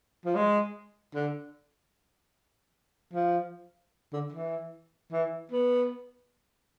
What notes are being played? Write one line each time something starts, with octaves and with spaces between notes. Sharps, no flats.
F3
G#3
D3
F3
D3
E3
E3
B3